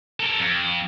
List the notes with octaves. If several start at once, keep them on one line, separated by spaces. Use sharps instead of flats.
A4 A#4
F2